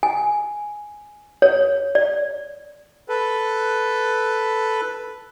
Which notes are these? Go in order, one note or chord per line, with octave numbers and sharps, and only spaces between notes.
G#5
C#5
D5
A4 B4